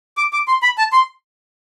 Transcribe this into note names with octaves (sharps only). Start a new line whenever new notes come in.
D6
D6
C6
B5
A5
C6